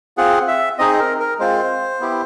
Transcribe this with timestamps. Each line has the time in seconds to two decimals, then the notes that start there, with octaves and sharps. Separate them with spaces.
0.17 C4 F4 G#4 F#5
0.48 E5
0.78 C4 D#4 G#4 D#5
1.00 A#4
1.20 A#4
1.39 G#3 C4 F4 C5
2.00 B3 E4 G4